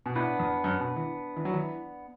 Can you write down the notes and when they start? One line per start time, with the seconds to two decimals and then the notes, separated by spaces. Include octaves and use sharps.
0.06 B2
0.15 A2 B3 D4 B4
0.40 E2
0.64 F#2
0.80 B2
0.96 E3
1.36 E3
1.45 F#3
1.54 E3